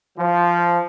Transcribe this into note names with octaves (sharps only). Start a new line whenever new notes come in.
F3